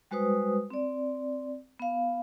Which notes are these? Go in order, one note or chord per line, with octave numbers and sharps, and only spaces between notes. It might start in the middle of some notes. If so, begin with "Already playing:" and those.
G3 G#3 F#4 B4 C5 D#6
C4 D5
B3 F5